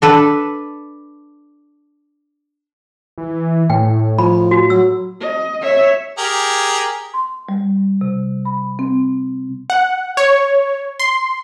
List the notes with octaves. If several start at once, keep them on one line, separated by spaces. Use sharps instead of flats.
D4 A4 B4
E3
A2 G5
F3 B5
F#4
F#3 E6
D#5
C#5 E5
G4 G#4 A#4
C6
G3
C3
B5
C4
F#5
C#5
C6